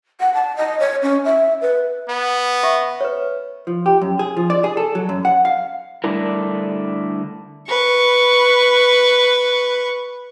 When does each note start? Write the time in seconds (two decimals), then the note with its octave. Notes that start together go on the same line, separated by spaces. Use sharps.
0.20 F#5
0.34 A5
0.57 D#5
0.79 C#5
1.03 C#4
1.25 E5
1.61 B4
2.09 B3
2.63 E5 C#6
3.01 B4 C#5
3.67 F3
3.86 G4
4.02 F#2
4.19 G#4
4.37 F3
4.50 D5
4.64 G#4
4.77 A4
4.95 F#3
5.09 F#2
5.25 F#5
5.45 F5
6.04 D3 G3 A3 D4 E4 A#4
7.69 B4 C#6